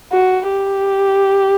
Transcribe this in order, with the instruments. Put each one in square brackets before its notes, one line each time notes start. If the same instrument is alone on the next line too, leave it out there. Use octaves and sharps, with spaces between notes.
[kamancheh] F#4
G4